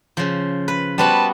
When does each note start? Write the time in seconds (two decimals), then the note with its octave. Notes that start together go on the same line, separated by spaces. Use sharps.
0.17 C#3 F3
0.68 B4
0.98 G3 B3 F#4 B4 C5 A5